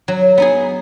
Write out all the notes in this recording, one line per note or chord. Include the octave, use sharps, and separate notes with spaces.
F#3
B3 D#4 G#4